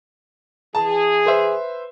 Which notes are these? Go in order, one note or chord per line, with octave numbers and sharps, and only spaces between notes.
E3 G#4 A5
B4 C5 E5